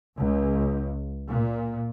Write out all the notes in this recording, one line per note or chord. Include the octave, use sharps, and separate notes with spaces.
C#2
A#2